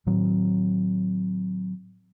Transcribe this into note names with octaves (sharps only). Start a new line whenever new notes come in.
A2 D#3 F#3 C4